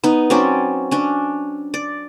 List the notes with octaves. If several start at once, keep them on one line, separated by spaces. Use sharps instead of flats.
B3 D#4
F#3 C4 C#4 D5
C#4 D4
D5